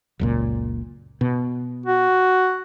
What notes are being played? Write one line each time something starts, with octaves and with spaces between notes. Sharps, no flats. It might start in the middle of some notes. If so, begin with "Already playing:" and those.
F#1 C#2 A#2
B2
F#4